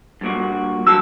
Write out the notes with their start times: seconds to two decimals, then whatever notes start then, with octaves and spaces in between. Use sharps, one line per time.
0.21 G2 A#2 F#4
0.87 F#3 F#4 A5 E6